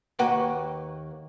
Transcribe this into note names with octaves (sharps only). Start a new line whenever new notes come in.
D#2 A#3 F#4 B4 F#5 G5